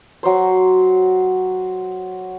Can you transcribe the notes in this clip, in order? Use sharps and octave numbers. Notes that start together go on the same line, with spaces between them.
F#3 C5